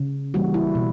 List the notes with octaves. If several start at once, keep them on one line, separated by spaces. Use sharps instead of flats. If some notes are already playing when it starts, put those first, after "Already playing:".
Already playing: C#3
E3 G3 A#3 F#4
E4
B2